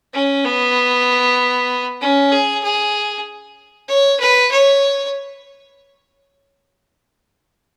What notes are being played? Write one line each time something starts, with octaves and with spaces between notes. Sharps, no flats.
C#4
B3
C#4
G#4
G#4
C#5
B4
C#5